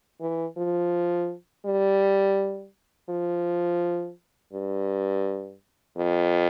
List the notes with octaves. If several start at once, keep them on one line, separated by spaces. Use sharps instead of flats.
E3
F3
G3
F3
G2
F2